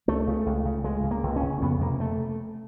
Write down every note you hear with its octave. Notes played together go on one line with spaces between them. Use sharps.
C#2 A3
C#3
C#2
C#3
C#2 G#3
C#3
A#3
C#2
C#4
C#3
F2 B3
C3 A#3
A3